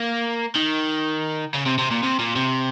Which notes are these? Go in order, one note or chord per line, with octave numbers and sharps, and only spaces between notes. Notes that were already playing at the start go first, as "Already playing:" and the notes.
Already playing: A#3
D#3
C#3
C3
C3
A#2
C3
A#2
C3